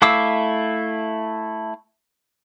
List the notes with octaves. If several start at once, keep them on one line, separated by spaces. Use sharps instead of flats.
A3 E4 F5 D6 E6